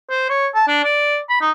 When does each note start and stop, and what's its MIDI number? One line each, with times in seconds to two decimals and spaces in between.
0.10 0.26 72
0.29 0.47 73
0.55 0.64 81
0.68 0.80 62
0.84 1.17 74
1.29 1.36 83
1.41 1.51 63